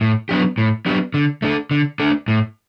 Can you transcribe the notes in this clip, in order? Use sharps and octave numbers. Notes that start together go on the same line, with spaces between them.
A2
F#3 B3 D4 G4
A2
F#3 B3 D4 G4
D3
A3 D4 A4
D3
A3 D4 A4
A2